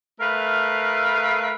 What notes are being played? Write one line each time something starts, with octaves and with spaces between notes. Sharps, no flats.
A3 A#4 B4 E5 F5